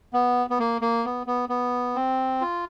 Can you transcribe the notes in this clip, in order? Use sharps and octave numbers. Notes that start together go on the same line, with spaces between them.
B3
B3
A#3
A#3
B3
B3
B3
C4
F4